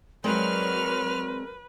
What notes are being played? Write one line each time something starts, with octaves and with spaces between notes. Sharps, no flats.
F#3 G#3 C4 A#4 B4 D5 F6